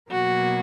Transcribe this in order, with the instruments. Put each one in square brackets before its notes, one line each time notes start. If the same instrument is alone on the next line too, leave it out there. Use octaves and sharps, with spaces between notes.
[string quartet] B2 F#3 A#3 F#4